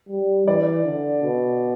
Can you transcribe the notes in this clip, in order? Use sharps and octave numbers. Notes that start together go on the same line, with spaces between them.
G3
E3 D5
D3
B2